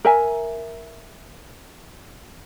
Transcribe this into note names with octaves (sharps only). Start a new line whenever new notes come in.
A#4 E5 G#5